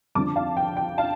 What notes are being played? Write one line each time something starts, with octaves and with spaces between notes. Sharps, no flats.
F2 D3 F3 A5 D6
F5 A5
G5
G5
F5 A5